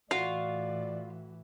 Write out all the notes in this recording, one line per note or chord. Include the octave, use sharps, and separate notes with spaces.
A2 E3 F4 F#4 D5